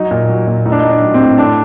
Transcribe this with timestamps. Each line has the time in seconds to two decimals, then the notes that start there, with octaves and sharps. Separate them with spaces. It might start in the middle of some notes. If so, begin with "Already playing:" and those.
Already playing: F#3 D#4
0.11 A#2
0.29 F#3
0.47 A#2
0.66 A2 D#4
0.72 D4
0.80 D#4
0.84 A2
0.90 D4
1.01 F#3
1.14 C4
1.20 A2
1.38 A2 D4